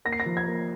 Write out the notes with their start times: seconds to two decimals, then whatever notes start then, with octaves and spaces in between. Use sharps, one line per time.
0.05 A#3 A#6
0.13 C7
0.20 A#6
0.26 F3
0.37 G#6
0.48 A#3